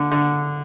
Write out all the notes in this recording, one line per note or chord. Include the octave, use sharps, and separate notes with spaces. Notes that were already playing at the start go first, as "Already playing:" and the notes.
Already playing: D3
D3